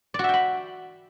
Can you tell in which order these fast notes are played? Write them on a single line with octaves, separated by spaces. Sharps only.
D5 F#4 E5 G5 B5